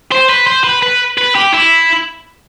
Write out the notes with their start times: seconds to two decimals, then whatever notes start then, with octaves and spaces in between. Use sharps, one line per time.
0.12 C5
0.29 B4
0.47 C5
0.64 B4
0.82 B4
1.18 B4
1.35 G4
1.53 E4